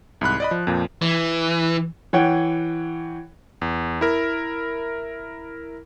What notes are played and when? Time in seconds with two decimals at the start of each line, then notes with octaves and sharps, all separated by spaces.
0.21 C2 G#2 B5 F#6
0.40 D5 D#5 B5
0.51 F3
0.67 F2 A#2 F3
1.02 E3
2.13 E3 C#5 F#5 G5
3.61 E2
4.01 E4 A#4